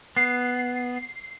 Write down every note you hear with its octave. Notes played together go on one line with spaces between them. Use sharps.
B3 C7